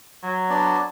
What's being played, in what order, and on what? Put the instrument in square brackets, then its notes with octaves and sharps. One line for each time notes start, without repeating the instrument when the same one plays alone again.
[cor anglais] F#3
[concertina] B3 D4 D5